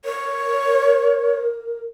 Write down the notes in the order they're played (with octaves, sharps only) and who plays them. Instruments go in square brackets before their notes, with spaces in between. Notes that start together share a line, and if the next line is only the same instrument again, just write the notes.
[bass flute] A#4 [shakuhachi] C#5